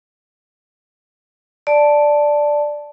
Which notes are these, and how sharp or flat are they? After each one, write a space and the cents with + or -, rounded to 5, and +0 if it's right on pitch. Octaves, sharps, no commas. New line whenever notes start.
D5 +0 A5 +0